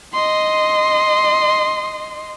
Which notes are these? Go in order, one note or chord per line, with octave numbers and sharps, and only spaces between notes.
D#5 C6